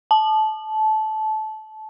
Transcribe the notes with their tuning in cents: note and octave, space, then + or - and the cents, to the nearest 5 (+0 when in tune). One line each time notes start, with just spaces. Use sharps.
A5 -20